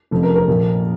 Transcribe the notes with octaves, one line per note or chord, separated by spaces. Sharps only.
F1 F2 C#3 F3
A#4
A#4
A#1 A#2 F3